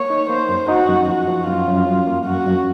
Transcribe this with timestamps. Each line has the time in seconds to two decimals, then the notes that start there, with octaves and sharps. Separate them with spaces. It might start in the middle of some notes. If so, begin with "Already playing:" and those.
Already playing: A#3 C#5
0.10 D#4
0.29 A#3 C5
0.49 F#2
0.68 D#4 F#4
0.89 F#2
1.08 F3 F#4
1.28 F3
1.47 F#2 F4
1.68 F#2
1.86 F#2
2.07 A#3
2.25 F#2 F#4
2.45 F#2